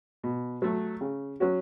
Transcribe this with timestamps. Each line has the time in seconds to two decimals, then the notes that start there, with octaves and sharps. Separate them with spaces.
0.24 B2
0.62 F#3 A3
1.01 C#3
1.40 F#3 C#4 F#4